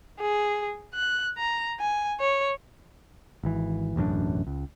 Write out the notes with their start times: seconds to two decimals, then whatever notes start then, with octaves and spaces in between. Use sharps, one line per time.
0.20 G#4
0.94 F#6
1.38 A#5
1.80 G#5
2.20 C#5
3.43 G#1 E3
3.96 E1 A1 F#2 D4
4.47 C#2